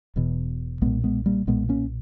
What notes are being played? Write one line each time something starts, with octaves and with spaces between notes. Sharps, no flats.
E1 E2 B2
B1 A#2 G#3 B3
G#3 B3
G3 A#3
B1 A#2 G#3 B3
A#3 C#4